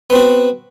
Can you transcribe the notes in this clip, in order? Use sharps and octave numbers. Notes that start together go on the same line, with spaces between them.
B3 C4 F#4